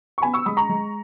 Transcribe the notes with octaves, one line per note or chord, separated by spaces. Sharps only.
C#6
B3 G#5 B5
C#6 E6
G#3 B5 D#6
A#5 C#6
G#3